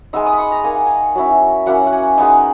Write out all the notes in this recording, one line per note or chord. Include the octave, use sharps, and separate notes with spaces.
G#3 B3 D#4 E6
D#6
B5
C#6
A#5
A#3 D#4 G#5
F#5
G#5
F#3 C#4 E4
F#3 A#3 C#4 E4 F#5
F#5
G#5
G#3 B3 D#4